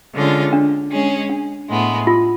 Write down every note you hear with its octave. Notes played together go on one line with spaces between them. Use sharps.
D3 G#3 C#4 F4
D4
G#3 C#4 G#4
D4
A2 G#3 B3
F4